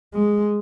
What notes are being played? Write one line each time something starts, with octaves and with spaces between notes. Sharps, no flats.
G#3